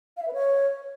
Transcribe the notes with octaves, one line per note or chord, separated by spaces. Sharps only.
F5
E5
B4
C#5